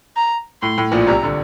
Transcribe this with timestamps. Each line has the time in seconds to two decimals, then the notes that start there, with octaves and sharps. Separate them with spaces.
0.16 A#5
0.62 A2 C6
0.78 A2
0.92 A#1 A#2
1.07 C2 C3 A#5
1.23 D3